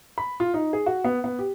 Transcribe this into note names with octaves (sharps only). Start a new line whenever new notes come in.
B5
F4
D#4
G#4
F#4
B3
B3
G4